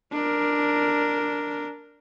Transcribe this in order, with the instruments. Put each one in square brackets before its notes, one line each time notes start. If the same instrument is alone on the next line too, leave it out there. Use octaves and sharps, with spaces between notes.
[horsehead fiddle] D4 A#4